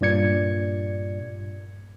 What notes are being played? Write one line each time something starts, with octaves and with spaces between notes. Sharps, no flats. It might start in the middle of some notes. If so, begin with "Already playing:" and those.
G2 A#2 D5 G#6 C#7